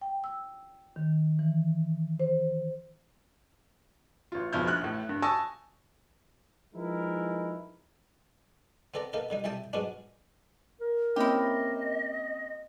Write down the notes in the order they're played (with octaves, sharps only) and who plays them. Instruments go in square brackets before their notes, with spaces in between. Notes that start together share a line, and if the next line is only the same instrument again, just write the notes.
[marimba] G5
E6
D#3
E3
C5
[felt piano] A1 F4
E1 B1 F3 B3 F6 G6
A#1 F6 F#6
A1 A2
G2
G#5 A5 C#6 D#6 E6 A#6
[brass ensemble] F3 G#3 D#4 E4 A#4 B4
[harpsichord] B3 C4 A4 D5 A#5
A#3 B3 D#4 A4 A#4
D3 G3 D#4
C2 G3 E5 G5 A5 D#6
G#2 F#3 G#3 B3 C#4 D4
[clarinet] A#4
[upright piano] A#3 C4 C#4 [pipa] E4 G4 [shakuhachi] D#5